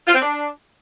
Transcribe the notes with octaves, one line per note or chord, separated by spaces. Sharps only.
F4
C4
D4